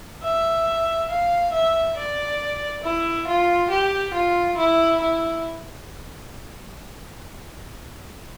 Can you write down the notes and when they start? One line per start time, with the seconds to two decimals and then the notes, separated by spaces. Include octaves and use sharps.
0.24 E5
1.10 F5
1.53 E5
1.97 D5
2.84 E4
3.27 F4
3.71 G4
4.14 F4
4.58 E4
5.01 E4